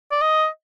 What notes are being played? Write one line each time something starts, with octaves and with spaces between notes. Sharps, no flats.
D5
D#5